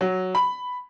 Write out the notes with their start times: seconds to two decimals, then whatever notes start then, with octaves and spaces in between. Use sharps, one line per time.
0.01 F#3
0.35 B5